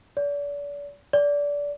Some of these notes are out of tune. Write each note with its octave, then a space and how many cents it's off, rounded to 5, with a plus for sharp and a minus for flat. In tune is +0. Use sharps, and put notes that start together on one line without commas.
D5 -35
D5 -20